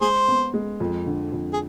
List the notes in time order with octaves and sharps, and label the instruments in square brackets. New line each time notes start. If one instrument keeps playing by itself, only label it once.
[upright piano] G#3 [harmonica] G#4 C5
[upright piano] B3
G#3
F2
D3
F2
[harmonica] G#4